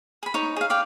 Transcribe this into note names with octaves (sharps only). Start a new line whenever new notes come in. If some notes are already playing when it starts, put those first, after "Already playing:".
G#4 B5
D#4 C#5
G#4 F5
D5 F5 G5